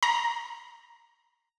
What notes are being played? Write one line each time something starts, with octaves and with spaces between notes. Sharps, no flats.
A#5